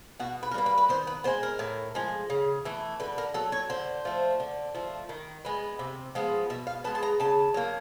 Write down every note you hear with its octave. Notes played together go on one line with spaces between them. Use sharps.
B2 F#4
B4
A#4
G3 A#3 B4
B4
B4
D#3 C5
B4
G#3 B3 C5
A#4
A2
F3 G#3
C#3
E3 A3
D3 B4
A#4
F#3 A3 A4
C#5
D3 C5
F3 A3
D3
F3 A3
D#3
G#3 B3
C3
F3 G#3 B3
B2 E5
F5
G#3 B3 A5
A5
A#5
C#3 A5
F#3 A#3